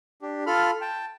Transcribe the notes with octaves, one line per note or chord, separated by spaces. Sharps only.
D4 G4
F4 A4 B5 F6
G5 A5